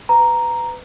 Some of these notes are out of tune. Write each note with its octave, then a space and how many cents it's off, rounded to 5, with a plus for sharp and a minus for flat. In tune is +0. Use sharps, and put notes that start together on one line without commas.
B4 +20 A#5 +0